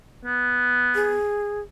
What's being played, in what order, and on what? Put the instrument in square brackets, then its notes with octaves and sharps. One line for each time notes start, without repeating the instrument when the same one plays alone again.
[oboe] B3
[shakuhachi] G#4